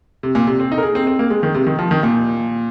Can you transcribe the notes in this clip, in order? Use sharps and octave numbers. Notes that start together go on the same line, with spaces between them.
C3
A#2
C3
C4
D#4
A#4
G#4
C4
C4
A#3
G#3
D#3
C3
D#3
F3
D#3
A#2